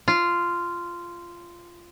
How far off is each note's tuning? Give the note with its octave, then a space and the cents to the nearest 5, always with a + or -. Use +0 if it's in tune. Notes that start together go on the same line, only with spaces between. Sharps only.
F4 -10